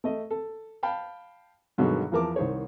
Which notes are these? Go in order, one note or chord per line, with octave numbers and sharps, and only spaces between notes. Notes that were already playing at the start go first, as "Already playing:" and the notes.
A3 D#5
A4
F5 G5 A5 B5
G2 B2 D3 D#3 F#3 G#3
E2 F3 A#4 A5 D6
C2 D#3 C5 C#5